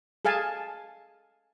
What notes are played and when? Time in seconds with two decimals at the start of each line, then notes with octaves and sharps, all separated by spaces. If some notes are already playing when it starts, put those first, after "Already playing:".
0.25 G#4 A4 F5 G#5 A5